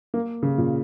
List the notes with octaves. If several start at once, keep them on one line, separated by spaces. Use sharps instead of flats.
A#3
C#3
A#2